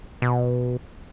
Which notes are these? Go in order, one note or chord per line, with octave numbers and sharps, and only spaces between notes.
B2